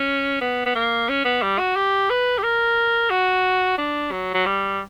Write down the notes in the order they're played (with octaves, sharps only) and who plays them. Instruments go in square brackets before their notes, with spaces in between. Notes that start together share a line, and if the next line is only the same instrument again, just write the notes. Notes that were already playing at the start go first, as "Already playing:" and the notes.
Already playing: [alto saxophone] C#4
B3
B3
A#3
C#4
B3
G3
F#4
G4
B4
G4
A#4
F#4
D4
F#3
F#3
G3